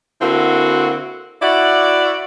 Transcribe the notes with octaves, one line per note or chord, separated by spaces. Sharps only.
D3 A#3 C4 E4 F#4
E4 F#4 D5